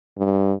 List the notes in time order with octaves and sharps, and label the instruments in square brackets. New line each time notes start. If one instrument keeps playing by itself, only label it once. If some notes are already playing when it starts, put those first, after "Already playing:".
[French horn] G2